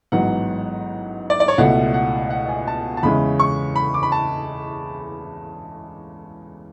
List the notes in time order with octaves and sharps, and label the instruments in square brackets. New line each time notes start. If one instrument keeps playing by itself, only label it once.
[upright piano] A1 G#2 F#3 B3 F#5
D5
D5
C#5
C#2 B2 A3 E4 F#5
F#5
F#5
G#5
A5
A5
E2 C#3 G#3 C#4 E4 B5
C#6
B5
D6
B5
A5